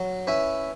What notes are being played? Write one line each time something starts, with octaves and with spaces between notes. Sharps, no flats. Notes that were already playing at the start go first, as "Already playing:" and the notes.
Already playing: F#3
C#4 E4 B4 E5